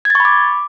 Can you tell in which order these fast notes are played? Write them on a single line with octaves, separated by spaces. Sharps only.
G#6 A6 C#6 B5 D6